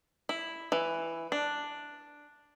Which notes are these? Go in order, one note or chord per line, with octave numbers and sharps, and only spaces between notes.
E4
E3
D4